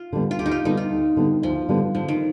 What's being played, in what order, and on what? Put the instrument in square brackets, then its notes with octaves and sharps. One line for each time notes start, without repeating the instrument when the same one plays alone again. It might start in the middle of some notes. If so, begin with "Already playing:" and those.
Already playing: [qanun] F4
[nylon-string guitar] D3 G3 B3
[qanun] F4
[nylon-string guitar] D2 [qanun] G4
[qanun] D#4
F4
[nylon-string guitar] D3 G3 B3 [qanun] D#4
[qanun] F4
[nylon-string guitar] D2
D3 G3 B3
[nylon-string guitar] D2 [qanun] F3
[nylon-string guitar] D3 G3 B3
[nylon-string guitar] D3 [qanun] F3
[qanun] D#3